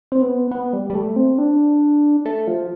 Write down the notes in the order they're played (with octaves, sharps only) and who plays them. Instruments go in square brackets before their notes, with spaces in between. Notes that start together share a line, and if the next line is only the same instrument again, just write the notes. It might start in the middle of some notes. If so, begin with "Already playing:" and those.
[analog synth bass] C4
B3
B3
G3
G3
A3
C4
D4
A3
F3